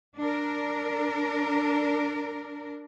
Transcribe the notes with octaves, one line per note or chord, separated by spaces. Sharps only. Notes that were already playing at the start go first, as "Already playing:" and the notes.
D4 A#4